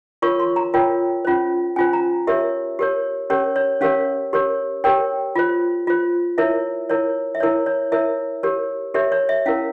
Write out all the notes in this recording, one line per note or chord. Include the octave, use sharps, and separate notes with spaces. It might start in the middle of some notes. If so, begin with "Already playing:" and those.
F4 A#4 C#5 C#6
C6
A#5
F4 A#4 C#5 G5
C#4 F4 C5
C#4 F4 C5 G#5
A#5
G4 A#4 C#5 E5
G4 A#4 C#5
C#4 G4 A#4 C#5
C#5
C#4 G4 A#4 C#5 F5
G4 A#4 C#5
G4 A#4 C#5 G5
F4 C5
F4 C5
E4 A#4 C#5 E5
E4 A#4 C#5
E5
E4 A#4 C#5
C#5
E4 A#4 C#5 E5
G4 A#4 C#5
G4 A#4 C#5 E5
C#5
E5
C#4 E4 A#4 F5